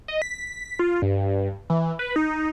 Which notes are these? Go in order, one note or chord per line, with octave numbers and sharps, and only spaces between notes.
D#5
B6
F4
G2
E3
B4
D#4